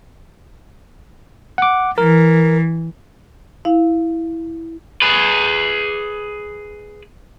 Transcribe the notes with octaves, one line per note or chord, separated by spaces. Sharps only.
F#5 D6
E3 A#4
E4 F5
G#4 B4